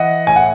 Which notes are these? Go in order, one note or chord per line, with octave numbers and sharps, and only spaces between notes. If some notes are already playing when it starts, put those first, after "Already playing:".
Already playing: E3 D#5 F#5
A2 G#5
F#5